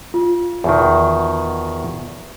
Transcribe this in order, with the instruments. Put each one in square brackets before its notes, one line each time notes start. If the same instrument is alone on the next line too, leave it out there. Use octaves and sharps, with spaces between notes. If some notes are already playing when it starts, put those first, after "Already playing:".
[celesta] F4
[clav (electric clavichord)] E2 B2 D#3